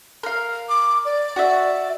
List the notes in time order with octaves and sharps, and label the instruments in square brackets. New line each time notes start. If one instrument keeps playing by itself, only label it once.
[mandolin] A#4 F5
[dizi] D6
D5
[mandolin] F#4 E5